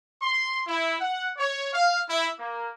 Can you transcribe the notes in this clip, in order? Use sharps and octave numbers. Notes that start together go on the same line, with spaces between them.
C6
E4
F#5
C#5
F5
E4
A#3